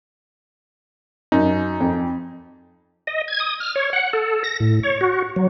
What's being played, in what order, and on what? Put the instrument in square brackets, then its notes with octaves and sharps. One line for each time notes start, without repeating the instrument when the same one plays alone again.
[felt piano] F#2 [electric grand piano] D#4
[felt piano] F2
[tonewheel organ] D#5
G#6
D#6
F6
C#5
F#5
A4
A#6
A2
C#5
F#4
F#3